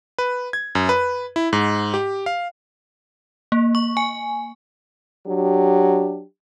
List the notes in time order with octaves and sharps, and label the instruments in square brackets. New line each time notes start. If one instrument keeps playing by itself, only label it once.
[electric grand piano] B4
G#6
F#2
B4
E4
G#2
G4
F5
[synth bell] A#3
C#6
G#5
[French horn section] F#3 D4 G4